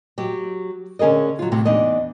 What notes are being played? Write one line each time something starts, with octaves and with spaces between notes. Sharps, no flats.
F#3 G4
D3 C#4 G#4 A#4 D#5
F#3 F4
A2 C3 F#3
E2 D4 D#4 D#5